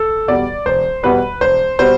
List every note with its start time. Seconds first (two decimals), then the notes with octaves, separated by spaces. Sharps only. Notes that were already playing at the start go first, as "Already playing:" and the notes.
Already playing: A4
0.28 E2 B2 G3 D5
0.66 E1 C5
1.03 E2 B2 G3 B4
1.41 E1 C5
1.79 B2 G3 C5